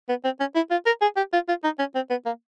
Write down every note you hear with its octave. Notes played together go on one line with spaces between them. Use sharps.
B3
C4
C#4
E4
F4
A#4
G#4
G4
F4
F4
D#4
C#4
C4
B3
A#3